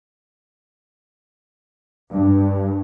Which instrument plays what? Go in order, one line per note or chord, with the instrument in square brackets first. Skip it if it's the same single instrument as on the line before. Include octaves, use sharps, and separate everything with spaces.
[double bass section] G2